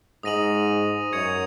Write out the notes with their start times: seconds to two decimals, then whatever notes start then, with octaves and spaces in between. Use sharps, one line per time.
0.23 G#2 D#6 A#6 D#7 F#7
1.12 F#2 C#6 G#6 C#7 F7